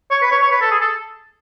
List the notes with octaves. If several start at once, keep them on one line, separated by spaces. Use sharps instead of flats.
C#5
B4
C#5
C#5
B4
A4
G#4
A4